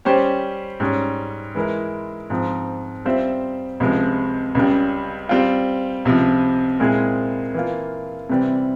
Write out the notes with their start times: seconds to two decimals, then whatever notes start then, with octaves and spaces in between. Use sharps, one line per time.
0.05 G3 C#4 G4 C5
0.80 G#2 G3 C#4
1.55 E3 G#3 E4 A#4
2.30 G#2 F3 C4
3.05 G3 C4 F4 C5 E5
3.80 C#2 C3 F3 G#3
4.55 C#2 C#3 G3
5.29 G3 C4 F4
6.05 C#2 C3 F3
6.80 A#2 G#3 C4 E4 G#4
7.54 E3 A#3 F4
8.29 C3 E3 G3 C4